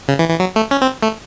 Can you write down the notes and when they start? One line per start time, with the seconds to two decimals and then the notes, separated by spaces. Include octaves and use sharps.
0.08 C#3
0.19 E3
0.29 E3
0.40 F#3
0.56 A3
0.71 C#4
0.82 C4
1.03 A3